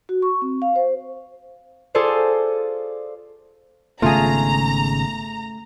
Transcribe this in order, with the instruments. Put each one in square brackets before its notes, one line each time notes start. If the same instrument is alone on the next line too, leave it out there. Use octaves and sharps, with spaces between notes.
[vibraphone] F#4
C#6
C4
F5
C5
[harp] F4 G#4 A4 C5 D5
[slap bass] G#1 C#3 B3 [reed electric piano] A3 [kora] F4 G#4 [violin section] A#5